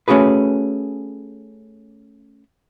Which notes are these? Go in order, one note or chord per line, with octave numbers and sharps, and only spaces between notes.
A3 C#4 F#4 G#4 B4